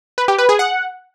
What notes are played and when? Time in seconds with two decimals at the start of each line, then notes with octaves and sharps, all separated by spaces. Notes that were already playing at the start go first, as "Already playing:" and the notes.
0.18 B4
0.28 G4
0.38 B4
0.49 G#4
0.59 F#5